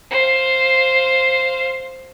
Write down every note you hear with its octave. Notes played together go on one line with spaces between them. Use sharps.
C5 F5